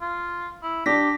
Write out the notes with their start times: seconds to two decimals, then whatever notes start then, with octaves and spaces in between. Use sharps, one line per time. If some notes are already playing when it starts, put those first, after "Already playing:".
0.01 F4
0.63 E4
0.86 D4 G4 D6 A#6 B6